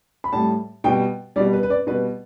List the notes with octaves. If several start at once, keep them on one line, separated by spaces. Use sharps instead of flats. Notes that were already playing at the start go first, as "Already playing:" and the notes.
B5
A2 G3 A5
B2 G3 G5
B2 G3 D5
B4
B4
D5
B2 G3 B4